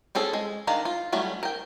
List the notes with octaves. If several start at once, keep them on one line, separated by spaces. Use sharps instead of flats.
C4 C#4 G#4 A4
G#3
D#3 D4 F5 A#5
F4
F#3 G3 A3 C#4
A#4 G5